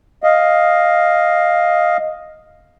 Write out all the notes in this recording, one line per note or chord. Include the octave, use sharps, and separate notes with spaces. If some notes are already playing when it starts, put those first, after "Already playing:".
D#5 F5